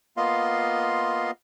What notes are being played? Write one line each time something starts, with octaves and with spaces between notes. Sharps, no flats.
A#3 B3 F4 D#5 F5 C6